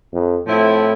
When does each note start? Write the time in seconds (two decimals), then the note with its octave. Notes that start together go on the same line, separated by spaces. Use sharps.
0.13 F2
0.47 A2 F3 C4 E4